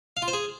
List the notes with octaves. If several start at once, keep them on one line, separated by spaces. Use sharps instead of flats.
F5
F4
C5
G#4